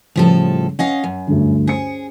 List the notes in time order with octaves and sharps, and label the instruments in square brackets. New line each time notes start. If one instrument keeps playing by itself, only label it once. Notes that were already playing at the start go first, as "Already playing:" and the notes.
[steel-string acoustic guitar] A2 F3 A4 [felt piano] C#3 G3
[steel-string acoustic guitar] C#4 D#5 F5 [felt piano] F#5
[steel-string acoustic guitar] F#2
[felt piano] D2 G2 D3
[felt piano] C#4 C5 C#7 [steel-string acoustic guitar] G#4